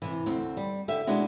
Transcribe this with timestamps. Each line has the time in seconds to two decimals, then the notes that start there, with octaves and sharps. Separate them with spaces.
0.02 C3 E3
0.26 D2 C4
0.57 G3
0.88 D3 G4 E5
1.07 B2 G#3 B3 D4 E4 F#4